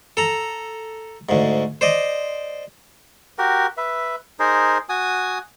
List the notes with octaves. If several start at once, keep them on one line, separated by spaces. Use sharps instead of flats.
A4 A#5
D2 G#2
C5 D5 D#5
F#4 G4 A#4
B4 E5
D#4 G#4 A#4 C5
F#4 G#5 D#6